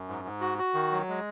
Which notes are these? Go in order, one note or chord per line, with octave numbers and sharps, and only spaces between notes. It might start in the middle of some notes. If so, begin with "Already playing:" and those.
Already playing: F#2
G#2
G#2
F#4
F#4
D#3
F#3
G#3